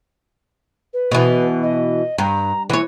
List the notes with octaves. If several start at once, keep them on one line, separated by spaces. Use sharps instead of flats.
B4
B2 E3
D#5
G2 A#5
E3 C#5